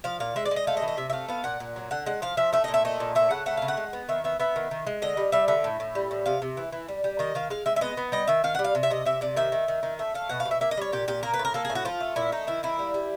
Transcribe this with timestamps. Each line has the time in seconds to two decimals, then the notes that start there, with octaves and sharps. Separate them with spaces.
0.04 F3 F5
0.20 A#2 F5
0.36 G#3 E5
0.45 D5
0.51 G#3
0.56 D#5
0.67 A3 F5
0.77 D#5
0.82 E3
0.88 D#5
0.97 C3 E5
1.10 E5
1.13 A3 F5
1.28 B3 F5
1.44 A#2 F#5
1.60 A#2
1.76 F#3
1.91 D3 F#5
2.06 G#3 F#5
2.22 F3 F5
2.37 F3 E5
2.53 A3 E5
2.64 A#2 D#5
2.74 E5
2.85 A3 D#5
3.00 A#2
3.15 A3 E5
3.30 C#3 F#5
3.46 A3 F#5
3.57 C#3 F5
3.68 F#5
3.77 G#3
3.93 B3
4.09 D#3 E5
4.24 B3 E5
4.40 B3 E5
4.56 D#3
4.71 D#3
4.87 G#3
5.02 D3 D#5
5.17 G3
5.32 G3 E5
5.48 D3 E5
5.64 A2
5.80 A2
5.95 G3
6.11 A2
6.26 C3 F5
6.42 C3
6.57 E3
6.72 E3
6.88 G3
7.04 G3
7.19 D#3 D#5
7.35 D#3 F5
7.50 G#3 F5
7.66 G#3 E5
7.76 E5
7.81 B3 D#5
7.97 B3
8.12 G3 D#5
8.27 D#3 E5
8.44 D#3 F5
8.55 G3 F#5
8.64 F5
8.75 C3
8.83 E5
8.90 C3 D#5
9.05 C3 E5
9.21 C3 D5
9.36 D#3 E5
9.52 D#3
9.68 D#3
9.83 D#3
9.99 A3 E5
10.14 A3 F5
10.29 B2 F#5
10.40 F5
10.45 B2
10.51 E5
10.61 A#3 E5
10.71 D#5
10.77 G3 C#5
10.92 A#2 G4
11.08 A#2 G4
11.23 A#3 A#4
11.34 B4
11.39 A2
11.45 A#4
11.54 A#3 A4
11.65 G#4
11.70 A2
11.75 F#4
11.85 F3 F4
12.00 A3
12.16 A#2 E4
12.32 A3 D#4
12.47 D#3 E4
12.63 A#3 E4
12.79 G3
12.94 G3